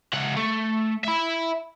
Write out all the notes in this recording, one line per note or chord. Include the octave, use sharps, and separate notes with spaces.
C#2 F#5
A3
E5 B5